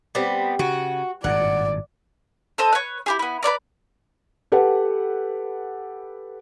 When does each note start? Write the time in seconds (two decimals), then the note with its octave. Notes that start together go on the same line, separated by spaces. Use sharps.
0.15 G3 B3 C4
0.59 C#3 F#4
1.24 G#1 G2 A#2 D5 F#5
2.58 A4 C5 D#5
2.72 B4 C#5
3.06 E4 G4 G#4
3.19 B3 E4
3.43 B4 C#5 D5 A#5
4.52 G4 A4 B4 F#5